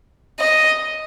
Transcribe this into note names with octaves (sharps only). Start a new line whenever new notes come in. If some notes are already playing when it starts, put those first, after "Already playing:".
D#5